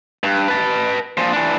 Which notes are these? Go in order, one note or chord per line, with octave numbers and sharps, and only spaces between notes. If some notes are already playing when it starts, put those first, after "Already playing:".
G2
B4 A5
A#2 F3
E3 D4